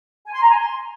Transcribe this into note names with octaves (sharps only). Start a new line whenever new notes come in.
G#5
C6
A#5
G#5
C6